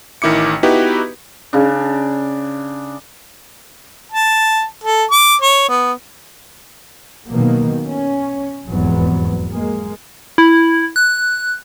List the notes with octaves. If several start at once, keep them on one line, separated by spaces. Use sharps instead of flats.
A1 D#3 E4 D6 C#7
B3 D#4 E4 F#4 G4 B4
C#3 D4
A5
A4
D6
C#5
B3
B2 D#3 F#3 A#3
C#4
F1 E2 G#2 F#3 B3
G#3 A#3
E4
F#6